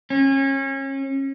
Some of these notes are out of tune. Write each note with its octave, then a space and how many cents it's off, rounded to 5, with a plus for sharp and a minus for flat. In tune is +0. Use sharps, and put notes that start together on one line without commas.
C#4 -30